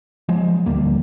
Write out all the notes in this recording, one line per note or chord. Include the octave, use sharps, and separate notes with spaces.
F3 G#3
D2 D3 G3 A#3